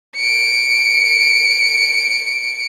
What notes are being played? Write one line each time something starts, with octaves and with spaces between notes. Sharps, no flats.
C#7 D7